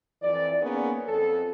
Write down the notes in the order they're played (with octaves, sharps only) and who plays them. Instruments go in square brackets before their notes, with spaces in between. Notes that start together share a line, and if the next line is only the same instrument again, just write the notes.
[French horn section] F2 E3 D5
A#3 B3 C#4 D#4 G#4
F2 A4